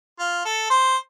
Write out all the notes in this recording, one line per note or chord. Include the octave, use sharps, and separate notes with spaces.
F4
A4
C5